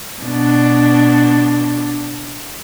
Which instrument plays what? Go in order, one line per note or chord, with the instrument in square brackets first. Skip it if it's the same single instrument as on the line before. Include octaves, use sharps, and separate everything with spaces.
[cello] B2 D4